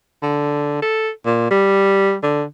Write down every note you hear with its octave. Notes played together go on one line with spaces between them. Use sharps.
D3
A4
A#2
G3
D3